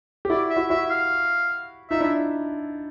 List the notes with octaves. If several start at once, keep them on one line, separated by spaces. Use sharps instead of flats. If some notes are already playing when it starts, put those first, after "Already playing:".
G4
E4 F#4 D5
E5
E4 F#4
E4 F#4 E5
F5
D#4 F4 E5
D4 E4
E5